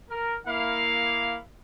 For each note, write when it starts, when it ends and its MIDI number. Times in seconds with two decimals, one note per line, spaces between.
0.10 0.36 70
0.47 1.37 58
0.47 1.37 64
0.47 1.37 77